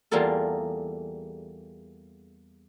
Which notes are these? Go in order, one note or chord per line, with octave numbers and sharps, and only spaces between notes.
E2 G3 A#3 F4 G#4 A4